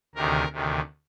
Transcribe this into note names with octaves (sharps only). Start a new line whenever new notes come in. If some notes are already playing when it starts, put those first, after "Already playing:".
D2 C3 D#3 A#4
D2 C3 D#3